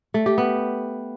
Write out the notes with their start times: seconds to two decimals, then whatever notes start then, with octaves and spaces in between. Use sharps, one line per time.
0.14 A3
0.26 G4
0.38 B3